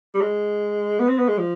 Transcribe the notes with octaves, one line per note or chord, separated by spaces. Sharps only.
G3
G#3
B3
C4
B3
G#3
F3